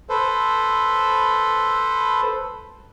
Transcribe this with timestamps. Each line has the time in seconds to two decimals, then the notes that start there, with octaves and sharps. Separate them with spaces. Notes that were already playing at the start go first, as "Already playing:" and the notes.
0.09 A4 B4 C5